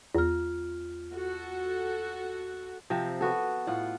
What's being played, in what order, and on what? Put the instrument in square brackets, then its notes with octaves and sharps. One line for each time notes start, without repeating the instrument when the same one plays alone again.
[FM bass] E2 [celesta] F4 F6
[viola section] F#4 A4
[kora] C3 F3 C4
B3 F#4 A4
A2 F4 F#5